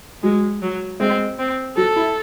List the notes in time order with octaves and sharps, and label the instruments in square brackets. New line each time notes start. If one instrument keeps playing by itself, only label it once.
[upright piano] F#3 [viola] G#3
[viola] F#3
[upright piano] G#3 [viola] C4
[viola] C4
[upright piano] F#3 [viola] A4
[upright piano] E4